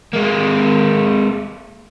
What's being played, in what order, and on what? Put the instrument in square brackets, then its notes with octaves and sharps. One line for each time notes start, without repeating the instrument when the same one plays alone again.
[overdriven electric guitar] G#3 A#3